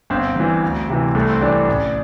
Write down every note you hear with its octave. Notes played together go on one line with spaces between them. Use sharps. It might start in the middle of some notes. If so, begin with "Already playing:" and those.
G1 C4
G2 E3
D2
C3 E3
C2 A3
C4
C3 E3 D4
A1